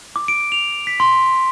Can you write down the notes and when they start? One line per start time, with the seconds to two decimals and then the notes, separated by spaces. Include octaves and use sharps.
0.16 D6
0.28 D7
0.52 F7
0.87 B6
1.00 C6